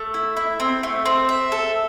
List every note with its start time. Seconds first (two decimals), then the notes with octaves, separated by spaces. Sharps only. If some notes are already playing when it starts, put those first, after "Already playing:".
Already playing: A3
0.14 E4
0.37 E4
0.60 C4
0.83 A3
1.06 C4
1.29 E5
1.52 A4